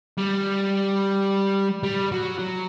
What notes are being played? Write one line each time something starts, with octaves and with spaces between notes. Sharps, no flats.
G3
G3
F#3
F#3